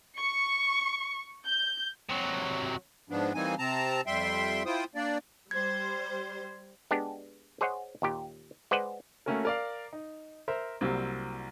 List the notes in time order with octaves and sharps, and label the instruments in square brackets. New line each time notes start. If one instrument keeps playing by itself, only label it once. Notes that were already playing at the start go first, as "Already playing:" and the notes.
[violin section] C#6
G6
[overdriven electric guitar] C3 F#3
[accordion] G#2 F3 B3 D4
E3 G3 A#3 C4 D#4 G#5
C3 C4 A5 A#5
F2 G3 E5 G5 C6
E4 F4 C5 G5 D#6
A#3 D4 D5
[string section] G3 C5 [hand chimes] G#6
[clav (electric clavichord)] G#3 B3 D4 G4
G#4 C5 C#5 D#5 F#5
D#2 A#2 G4
G#3 B4 C5 D5 D#5 F#5
[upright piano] A3 A#3 C#4 F#4 A#4
A#4 D5 F5
D#4
A#4 C5 E5
C2 F#3 G3 A#3 C4